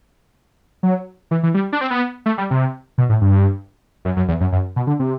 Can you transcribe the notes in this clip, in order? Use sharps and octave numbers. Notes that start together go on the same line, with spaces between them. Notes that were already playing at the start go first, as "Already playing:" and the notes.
F#3
E3
E3
G3
D4
C4
B3
A3
G3
C3
B2
A2
G2
F#2
F#2
E2
F#2
F#2
B2
D3
C3